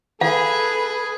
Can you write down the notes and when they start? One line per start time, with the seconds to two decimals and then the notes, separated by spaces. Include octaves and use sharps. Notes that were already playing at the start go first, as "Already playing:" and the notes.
0.21 G#4 A4 B4 F5